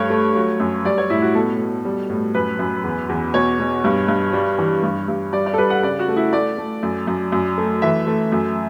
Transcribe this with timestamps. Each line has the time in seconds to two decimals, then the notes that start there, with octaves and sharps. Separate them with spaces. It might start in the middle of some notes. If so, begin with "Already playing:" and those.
Already playing: G2 A3 C#5
0.10 A3
0.35 F#3
0.60 F#2
0.85 G3 D5
0.98 C#5
1.09 A2 E4
1.22 F#4
1.35 B2 A4
1.59 B2
1.85 G3
2.10 A2
2.34 F#2 B4
2.59 F#2
2.84 E2
3.09 E2
3.34 B2 C#5
3.59 B2
3.84 G2
4.08 G2
4.33 G3
4.58 E3
4.83 G2
5.08 G2
5.33 G3 D5
5.46 D5
5.53 A4
5.58 G3 B4
5.70 F#5
5.83 C#3 D5
5.99 F#4
6.08 A3
6.16 E4
6.33 A3 D5
6.58 A3
6.83 F#2
7.07 F#2
7.32 F#2
7.58 A3
7.82 E3 E5
8.07 A3
8.32 F#2